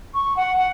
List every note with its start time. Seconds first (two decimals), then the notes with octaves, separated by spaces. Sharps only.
0.14 C#6
0.37 F#5
0.57 F#5